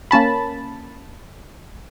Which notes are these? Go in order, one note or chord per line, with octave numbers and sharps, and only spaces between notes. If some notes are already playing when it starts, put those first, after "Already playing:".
A#3 C#4 A5 B5